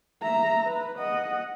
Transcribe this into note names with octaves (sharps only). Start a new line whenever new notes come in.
E5 A#5
B4
D#5 F#5